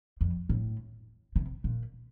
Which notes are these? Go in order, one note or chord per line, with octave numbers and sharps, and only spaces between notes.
F2
A2
C3
A#2